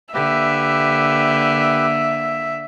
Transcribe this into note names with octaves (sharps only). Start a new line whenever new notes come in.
D3 A#3 G4 B4 E5